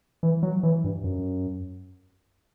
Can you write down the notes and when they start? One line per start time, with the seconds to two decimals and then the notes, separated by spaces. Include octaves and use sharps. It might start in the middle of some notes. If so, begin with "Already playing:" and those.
0.23 E3
0.43 F#3
0.63 E3
0.84 G2
1.04 F#2